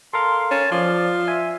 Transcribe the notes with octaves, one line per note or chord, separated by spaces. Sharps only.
A4 A#4 F5 C6
C#4 A5
F3 F4 D5
E5 G#5